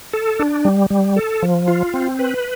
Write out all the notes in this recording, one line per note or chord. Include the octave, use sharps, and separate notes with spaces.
A4
D4
G3
G3
A4
F3
F4
C4
B4